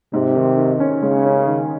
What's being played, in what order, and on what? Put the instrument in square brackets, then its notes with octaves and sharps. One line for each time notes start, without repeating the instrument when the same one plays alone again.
[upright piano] G#2 [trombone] C3
[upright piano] D#3
D#3
C#4
[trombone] C#3 [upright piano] G#3
[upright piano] C#4
D#3